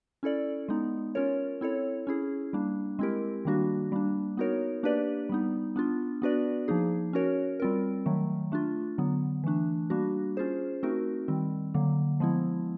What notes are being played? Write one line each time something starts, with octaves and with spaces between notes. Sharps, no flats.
C#4 E4 A4 D5
G#3 B3 D#4
C#4 F4 A#4 C#5
C4 E4 A4 C#5
C#4 E4 G#4
G3 A#3 D4
G#3 C4 E4 G4 A#4
D#3 G3 A#3 D4 F#4
G3 A#3 D4
B3 D#4 F#4 A#4 C#5
A#3 D4 G4 B4 D5
G3 B3 D#4
B3 D4 F4
B3 D4 F#4 B4 D5
F3 A#3 D#4 G#4
C#4 F#4 A#4 C#5
G3 C4 F4 A#4
D#3 F#3 A3
A3 D4 F4
D3 F#3 B3
E3 A3 D4
G3 A#3 D4 F#4
C#4 F4 G#4 C5
A3 C4 D#4 F#4 A#4
D#3 G3 C4
D3 F#3 A#3
F3 G#3 B3 E4